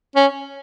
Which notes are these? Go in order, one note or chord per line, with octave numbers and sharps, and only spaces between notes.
C#4